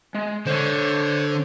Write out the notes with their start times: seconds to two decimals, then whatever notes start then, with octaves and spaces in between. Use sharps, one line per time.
0.15 G#3
0.47 D3 C5 C#5